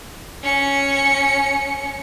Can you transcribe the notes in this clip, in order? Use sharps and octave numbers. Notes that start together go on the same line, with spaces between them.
C#4 C#7